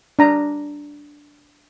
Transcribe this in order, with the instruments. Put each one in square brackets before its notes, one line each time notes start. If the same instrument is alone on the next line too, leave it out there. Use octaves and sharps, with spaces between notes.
[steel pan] D4 A#5